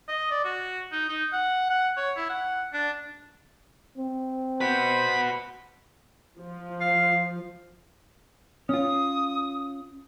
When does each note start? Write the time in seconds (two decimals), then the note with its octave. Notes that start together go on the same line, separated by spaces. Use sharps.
0.09 D#5
0.31 D5
0.44 F#4
0.92 D#4
1.09 D#4
1.33 F#5
1.70 F#5
1.97 C#5
2.16 E4
2.29 F#5
2.73 D4
3.97 C4
4.61 F#4 B4 C5 B5
6.40 F3
6.81 F5
8.69 C#4 F4 D#6